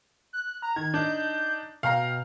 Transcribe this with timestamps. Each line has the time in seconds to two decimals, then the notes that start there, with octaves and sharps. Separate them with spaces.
0.33 F#6
0.62 A#5
0.76 D#3 G#6
0.94 D4 D#4 G6
1.83 B2 F5 G5 A#5